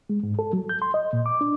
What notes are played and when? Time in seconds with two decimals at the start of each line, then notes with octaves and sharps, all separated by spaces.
0.10 G#3
0.23 G#2
0.39 A4
0.53 F#3
0.69 G6
0.82 C6
0.94 D#5
1.13 A#2
1.26 D6
1.41 D4